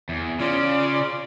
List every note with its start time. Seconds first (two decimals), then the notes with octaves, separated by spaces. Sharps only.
0.09 E2
0.40 C#3 C#4 F4 D5